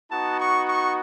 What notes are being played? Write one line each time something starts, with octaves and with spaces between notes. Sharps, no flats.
B3 D#4 F#4 A5
C#6
C#6